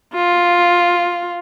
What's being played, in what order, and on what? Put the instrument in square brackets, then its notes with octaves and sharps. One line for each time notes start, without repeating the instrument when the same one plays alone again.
[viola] F4